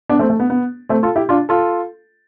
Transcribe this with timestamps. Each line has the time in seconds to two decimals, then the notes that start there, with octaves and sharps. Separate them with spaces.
0.09 B3 D4
0.19 A3 C4
0.30 A3
0.40 B3
0.50 B3
0.89 A3 C4
1.03 F4 A4
1.16 E4 G4
1.29 D4 F4
1.49 F4 A4